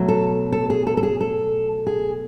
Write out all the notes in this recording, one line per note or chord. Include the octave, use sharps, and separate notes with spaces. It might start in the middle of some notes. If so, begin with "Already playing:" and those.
Already playing: B2 F#3 A3
A4
A4
G#4
A4
A4
G#4
A4
G#4